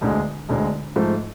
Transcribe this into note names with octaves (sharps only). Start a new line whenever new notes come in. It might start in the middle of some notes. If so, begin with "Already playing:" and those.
E1 D2 D3 G#3
E1 D2 D3 G#3
G#2 F3 A3